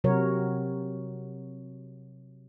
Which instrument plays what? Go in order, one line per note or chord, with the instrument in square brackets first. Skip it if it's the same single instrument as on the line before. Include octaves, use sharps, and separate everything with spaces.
[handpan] C3 F#3 F#4 A#4 C#5